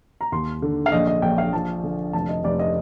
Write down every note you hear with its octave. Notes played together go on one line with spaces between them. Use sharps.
A#5
D#2 C6
D3
F5
A#1 D#5
D#5
A#1 G5
F5
F3 A5
D3
F1 A5
D#5
F1 D5
D#5